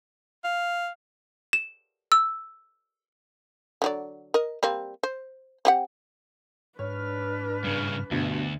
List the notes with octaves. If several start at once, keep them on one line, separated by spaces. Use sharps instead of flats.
F5
E7
E6
D3 F#3 D5
A#4 D#5
G3 A#3 C4
C5
C4 G4 F#5
G#2 D4 B4 C#5 F6
G2 C#3
D2 G2 B2